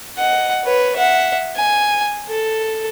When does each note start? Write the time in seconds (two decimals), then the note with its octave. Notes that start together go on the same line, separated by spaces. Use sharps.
0.17 D#5 F#5
0.65 B4 C#5
0.97 E5 F#5
1.57 G#5
2.29 A4